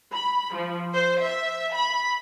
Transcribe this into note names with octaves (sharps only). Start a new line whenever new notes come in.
B5
F3
C5
E5
B5